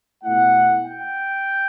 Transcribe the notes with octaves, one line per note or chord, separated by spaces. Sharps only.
B2 A3 E4 F#5
G5